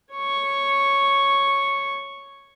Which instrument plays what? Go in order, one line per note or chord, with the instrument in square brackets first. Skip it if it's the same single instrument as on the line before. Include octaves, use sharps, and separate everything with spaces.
[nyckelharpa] C#5 C#6